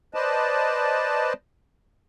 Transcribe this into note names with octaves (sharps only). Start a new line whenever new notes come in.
B4 C5 D5 D#5 A5